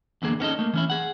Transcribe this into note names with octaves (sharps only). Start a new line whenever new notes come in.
E2 D3 A#3 G#4
B3 C#4 D#4 A4 D#5
A3 A#3
E3 C#4 E4
G#4 F#5